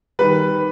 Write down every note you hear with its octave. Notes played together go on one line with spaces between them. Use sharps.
D#3 G3 B4